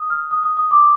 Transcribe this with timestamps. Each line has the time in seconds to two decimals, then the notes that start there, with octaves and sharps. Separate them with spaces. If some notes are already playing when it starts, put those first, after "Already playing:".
Already playing: D#6
0.10 F6
0.31 D#6
0.43 D#6
0.57 D#6
0.71 D6